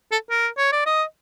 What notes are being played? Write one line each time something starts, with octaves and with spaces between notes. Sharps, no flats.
A4
A#4
C#5
D5
D#5